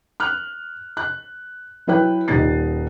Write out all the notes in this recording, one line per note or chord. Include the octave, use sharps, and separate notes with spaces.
F6 F#6
F#6
F#3 E4 B4 G5 F#6
D#1 G3 D#4 A6 C7